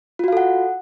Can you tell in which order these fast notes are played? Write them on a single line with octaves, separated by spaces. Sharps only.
F4 F#4 F5 A4 F#5